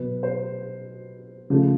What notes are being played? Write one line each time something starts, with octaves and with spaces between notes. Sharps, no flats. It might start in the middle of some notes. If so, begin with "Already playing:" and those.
Already playing: B2 F#3 B3 B4
C5
C#3 F3 A3